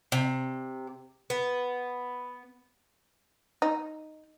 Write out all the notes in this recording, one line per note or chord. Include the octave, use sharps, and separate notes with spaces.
C3
B3
D#4